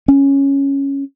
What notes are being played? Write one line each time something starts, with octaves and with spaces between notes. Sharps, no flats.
C#4